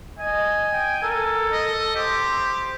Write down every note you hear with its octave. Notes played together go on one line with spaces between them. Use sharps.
D#5 G#5
G5
A4 A#4
D#5
G4 C5